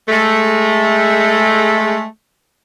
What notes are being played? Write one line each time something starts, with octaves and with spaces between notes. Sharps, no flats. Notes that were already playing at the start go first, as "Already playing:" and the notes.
G#3 A3